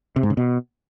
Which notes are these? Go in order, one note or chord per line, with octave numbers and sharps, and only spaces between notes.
C3
G#2
C#3
B2